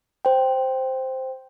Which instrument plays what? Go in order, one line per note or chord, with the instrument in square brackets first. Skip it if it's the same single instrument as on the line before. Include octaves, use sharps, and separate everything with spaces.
[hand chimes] C5 G5